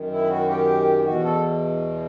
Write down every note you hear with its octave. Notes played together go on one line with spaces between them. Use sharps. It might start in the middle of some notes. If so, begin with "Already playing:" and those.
Already playing: F#2 D#3
E4
F#4
G4
E2 B2 F#4
A4